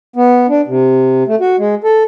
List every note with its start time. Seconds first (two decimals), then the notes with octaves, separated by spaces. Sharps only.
0.16 B3
0.49 D4
0.67 C3
1.27 A3
1.40 F#4
1.58 G#3
1.84 A4